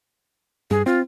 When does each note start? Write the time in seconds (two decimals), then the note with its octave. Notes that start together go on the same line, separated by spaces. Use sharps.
0.71 G2 G#4
0.86 C4 F4